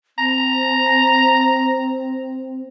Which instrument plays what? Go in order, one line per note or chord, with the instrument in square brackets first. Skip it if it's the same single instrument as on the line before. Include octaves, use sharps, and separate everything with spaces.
[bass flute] C4 [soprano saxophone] A#5